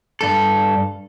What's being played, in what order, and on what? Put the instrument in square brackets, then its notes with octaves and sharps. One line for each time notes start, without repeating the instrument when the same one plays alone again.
[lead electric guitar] G2 A4